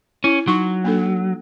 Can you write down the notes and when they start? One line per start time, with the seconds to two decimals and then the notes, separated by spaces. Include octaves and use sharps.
0.24 C#4 E4
0.47 F#3 D#4 C#6
0.84 A#3 D4 A4